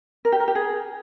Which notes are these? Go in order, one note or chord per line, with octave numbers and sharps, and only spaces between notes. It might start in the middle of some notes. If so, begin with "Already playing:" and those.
A#4
G4
A#4
G4
G#4